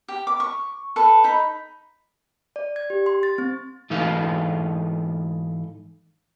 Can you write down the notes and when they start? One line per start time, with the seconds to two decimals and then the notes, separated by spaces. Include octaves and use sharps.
0.08 G4
0.27 D6
0.40 C#6
0.96 A4 B4
1.24 D#4 B5
2.56 D5
2.76 G#6
2.90 G4
3.06 C6
3.23 A6
3.38 C4
3.90 G#2 E3 D#4 A4 B4 F5